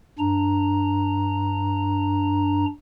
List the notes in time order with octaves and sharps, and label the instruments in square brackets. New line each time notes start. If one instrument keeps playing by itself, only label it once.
[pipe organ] G2 D4 A#5